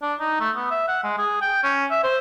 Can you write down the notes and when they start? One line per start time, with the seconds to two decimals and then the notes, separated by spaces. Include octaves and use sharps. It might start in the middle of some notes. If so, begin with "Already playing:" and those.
0.02 D4
0.20 D#4
0.40 A3
0.56 B3
0.71 E5
0.88 F#5
1.04 G#3
1.18 G#4
1.41 G5
1.63 C#4
1.91 E5
2.03 C5